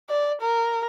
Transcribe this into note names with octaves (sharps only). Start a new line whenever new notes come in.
D5
A#4